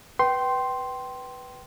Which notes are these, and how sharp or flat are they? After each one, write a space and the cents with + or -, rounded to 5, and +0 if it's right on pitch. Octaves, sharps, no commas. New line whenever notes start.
B4 +0 G5 -20 C6 +0